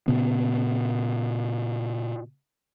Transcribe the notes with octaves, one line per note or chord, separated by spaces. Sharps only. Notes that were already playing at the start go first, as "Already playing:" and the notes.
A#2 C#3 B3